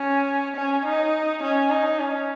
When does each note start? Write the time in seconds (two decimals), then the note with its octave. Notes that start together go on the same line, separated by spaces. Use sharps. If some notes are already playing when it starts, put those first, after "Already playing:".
Already playing: C#4
0.56 C#4
0.85 D#4
1.42 C#4
1.70 D#4
1.99 C#4